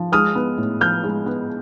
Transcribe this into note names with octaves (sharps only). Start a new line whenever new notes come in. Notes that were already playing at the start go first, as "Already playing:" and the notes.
Already playing: F3
G#3 D#6 F6
B3
A2
F3 F6 G6
G#3
B3